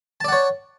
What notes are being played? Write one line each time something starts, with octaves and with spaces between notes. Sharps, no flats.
C#5 D5 F#5 A5